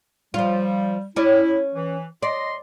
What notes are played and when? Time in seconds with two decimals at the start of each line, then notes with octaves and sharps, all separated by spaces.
0.34 F3 G3 F4
1.16 C#4 E4 D5
1.74 E3
2.23 D5 D#5 C6